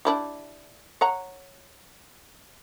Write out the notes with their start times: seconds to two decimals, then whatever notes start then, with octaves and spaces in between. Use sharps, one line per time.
0.05 D4 E4 G4
1.01 C#5 F#5 A#5